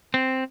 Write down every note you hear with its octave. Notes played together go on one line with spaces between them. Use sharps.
C4